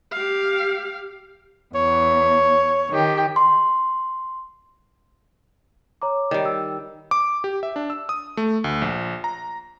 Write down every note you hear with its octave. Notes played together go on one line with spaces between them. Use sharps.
G4 F5
E2 C#5
D#3 G4
C6
C#5 A#5 D6
D#3 G3
E6
D6
G4
E5
D4
E6
D#6
A3
D2
A#1
A#5